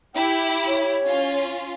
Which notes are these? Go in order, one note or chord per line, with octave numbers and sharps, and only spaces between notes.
E4 G4 G5
C#5
C#4 F4